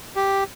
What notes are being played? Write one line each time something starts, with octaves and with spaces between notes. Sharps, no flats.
G4